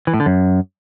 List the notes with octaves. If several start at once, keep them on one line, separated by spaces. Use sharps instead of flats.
E3
A2
D3
F#2